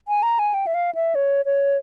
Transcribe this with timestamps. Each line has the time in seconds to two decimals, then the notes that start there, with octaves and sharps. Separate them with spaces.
0.08 G#5
0.23 A#5
0.39 G#5
0.54 G5
0.67 E5
0.74 F5
0.95 E5
1.15 C#5
1.45 C#5